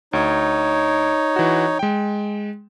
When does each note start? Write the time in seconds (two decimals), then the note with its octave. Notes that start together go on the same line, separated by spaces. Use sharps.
0.13 D2 D#4 C#5
1.36 E3 F#4
1.79 G#3 G5